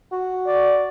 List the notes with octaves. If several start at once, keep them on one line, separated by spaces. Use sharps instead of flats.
F#4
D5